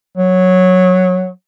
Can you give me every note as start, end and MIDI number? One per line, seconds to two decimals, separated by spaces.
0.17 1.30 54